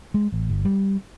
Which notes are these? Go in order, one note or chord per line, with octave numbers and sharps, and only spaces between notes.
G#3
A1
G1
G3